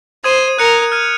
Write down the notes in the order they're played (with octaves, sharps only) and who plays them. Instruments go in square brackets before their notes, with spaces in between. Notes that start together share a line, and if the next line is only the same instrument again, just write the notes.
[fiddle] C5 [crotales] D#6 G#6 D#7
[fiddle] A#4 [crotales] F#6 C#7 F7
[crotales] F6 G#6 D#7